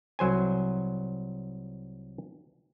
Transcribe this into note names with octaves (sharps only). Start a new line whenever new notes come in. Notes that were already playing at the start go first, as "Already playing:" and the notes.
C2 F#3 C5 G#5